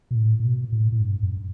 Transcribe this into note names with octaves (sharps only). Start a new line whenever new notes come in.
B2
A2
A2
B2
A2
A2
G2
F#2